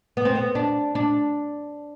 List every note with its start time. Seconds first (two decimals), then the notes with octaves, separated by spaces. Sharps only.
0.17 B3
0.25 C4
0.35 B3
0.55 D4
0.95 D4